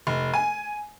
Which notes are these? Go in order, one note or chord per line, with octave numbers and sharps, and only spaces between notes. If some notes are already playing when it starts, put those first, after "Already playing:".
F1
G#5